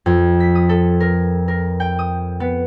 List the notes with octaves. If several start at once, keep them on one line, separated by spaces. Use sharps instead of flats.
F2
B6
D#6
A4
A#4
A#4
G5
D#6
B3